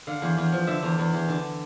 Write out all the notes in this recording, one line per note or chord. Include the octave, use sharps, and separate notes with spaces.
D3 F5
E2
E2
F3
D3 E5
E2
E2
E2
D3